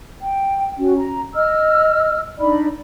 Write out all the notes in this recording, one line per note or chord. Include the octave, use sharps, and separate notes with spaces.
G5
C#4 F#4
A#5
D#5 E6 F6
D4 D#4 D5 B5